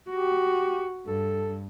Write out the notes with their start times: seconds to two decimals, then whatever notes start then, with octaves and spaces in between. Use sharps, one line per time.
0.11 F#4 G4
1.07 G2 A4